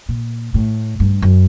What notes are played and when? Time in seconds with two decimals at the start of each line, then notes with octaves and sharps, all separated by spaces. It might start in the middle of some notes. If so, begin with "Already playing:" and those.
0.09 A#2
0.54 A2
1.00 G2
1.22 F#2